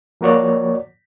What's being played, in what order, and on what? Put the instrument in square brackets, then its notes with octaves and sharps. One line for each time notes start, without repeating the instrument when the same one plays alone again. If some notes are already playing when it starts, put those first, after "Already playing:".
[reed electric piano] F3 A#3 F#4 C#5 D5